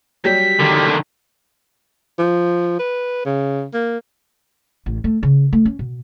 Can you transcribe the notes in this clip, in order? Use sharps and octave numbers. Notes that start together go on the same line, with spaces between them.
F#3 G3 G4 B6
D3 D#3
F3
B4
C#3
A#3
A1
A3
C#3
A3
C#4
B2